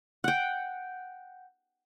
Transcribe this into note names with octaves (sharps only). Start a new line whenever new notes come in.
F#5 G5